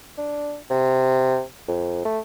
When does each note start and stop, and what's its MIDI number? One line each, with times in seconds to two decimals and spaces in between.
0.18 0.56 62
0.70 1.41 48
1.68 2.01 41
2.05 2.19 57